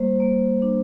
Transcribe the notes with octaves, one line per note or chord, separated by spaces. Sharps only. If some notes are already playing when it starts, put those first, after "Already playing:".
Already playing: G3 A#3 C5
A#3
D4